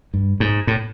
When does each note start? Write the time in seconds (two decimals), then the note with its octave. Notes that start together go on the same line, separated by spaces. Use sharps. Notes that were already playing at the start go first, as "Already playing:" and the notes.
0.14 G2
0.40 G#2
0.67 A2